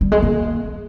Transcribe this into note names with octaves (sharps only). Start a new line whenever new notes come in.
G3
G#3
A#3